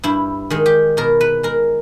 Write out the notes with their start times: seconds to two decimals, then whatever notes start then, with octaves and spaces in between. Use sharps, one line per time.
0.04 G2 E4
0.50 D#3 G#3
0.66 G4
0.97 B2 A#4
1.21 B4
1.43 G#3 A#4